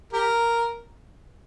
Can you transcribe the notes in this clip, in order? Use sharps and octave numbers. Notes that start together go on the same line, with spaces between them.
G4 A#4